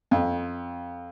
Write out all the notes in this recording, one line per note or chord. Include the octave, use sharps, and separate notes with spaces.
F2